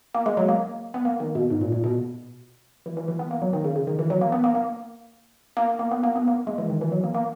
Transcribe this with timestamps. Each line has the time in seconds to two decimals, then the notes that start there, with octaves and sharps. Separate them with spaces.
0.15 A#3
0.26 G#3
0.37 F#3
0.49 A#3
0.94 B3
1.05 A#3
1.20 D#3
1.35 B2
1.50 G#2
1.61 A#2
1.72 A#2
1.84 B2
2.86 E3
2.97 E3
3.08 E3
3.19 B3
3.31 A#3
3.42 F#3
3.53 D#3
3.64 C#3
3.76 C#3
3.87 D#3
3.99 E3
4.10 F#3
4.21 A#3
4.32 B3
4.44 A#3
4.55 A#3
5.57 A#3
5.79 A#3
5.91 B3
6.03 A#3
6.16 B3
6.28 A#3
6.47 G#3
6.58 E3
6.70 D#3
6.81 E3
6.92 F#3
7.04 A#3
7.14 A#3